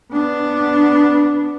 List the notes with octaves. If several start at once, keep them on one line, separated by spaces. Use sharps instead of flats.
B3 D4